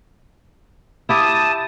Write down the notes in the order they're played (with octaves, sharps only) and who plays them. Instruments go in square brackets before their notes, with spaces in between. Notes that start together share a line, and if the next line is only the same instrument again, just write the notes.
[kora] E4 G4 [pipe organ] A5 D#6